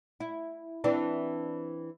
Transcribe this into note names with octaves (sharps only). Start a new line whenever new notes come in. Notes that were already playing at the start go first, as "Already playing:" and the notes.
E4
E3 C4 D4